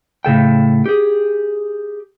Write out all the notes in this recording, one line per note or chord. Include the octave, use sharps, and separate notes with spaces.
A2 C#3 A4 G5
G4 G#4